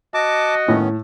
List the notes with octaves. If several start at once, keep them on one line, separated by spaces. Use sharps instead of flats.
F#4 D#5 A5 D6
A2 D#3 B3 C#4